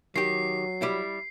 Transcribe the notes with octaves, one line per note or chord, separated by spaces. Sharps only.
D#3 F#3 G4 C7
G3 E4